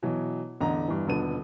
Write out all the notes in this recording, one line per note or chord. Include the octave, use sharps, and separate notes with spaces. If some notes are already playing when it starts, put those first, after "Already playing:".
B2 E3 F#3
A1 E2 D3 D#5 A#5
G2 E3
D#1 B2 D3 B4 A5 D#7